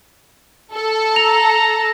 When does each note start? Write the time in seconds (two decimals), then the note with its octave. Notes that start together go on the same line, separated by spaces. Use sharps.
0.75 A4
1.16 A#5 F7